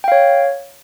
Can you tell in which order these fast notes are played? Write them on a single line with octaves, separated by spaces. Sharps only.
G5 F5 C#5